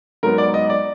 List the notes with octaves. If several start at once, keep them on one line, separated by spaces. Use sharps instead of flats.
G#2 F#3 B3 A#4
D5
D#5
D5